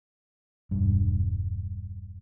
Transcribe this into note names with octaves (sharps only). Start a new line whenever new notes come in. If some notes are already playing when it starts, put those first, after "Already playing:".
E1 G2